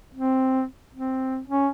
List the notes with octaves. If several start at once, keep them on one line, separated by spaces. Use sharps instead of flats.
C4
C4
C#4